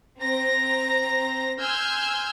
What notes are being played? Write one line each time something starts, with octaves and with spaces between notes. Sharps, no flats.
C4 A#5 A#6
G#5 C6 E6 F6 G6 G#6